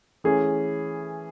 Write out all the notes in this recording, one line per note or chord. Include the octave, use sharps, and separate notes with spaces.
E3 A3 C#4 G#4